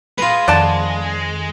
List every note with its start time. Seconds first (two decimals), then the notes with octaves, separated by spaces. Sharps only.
0.18 G#3 F4 B4
0.48 F2 D#3 D5 F#5 A5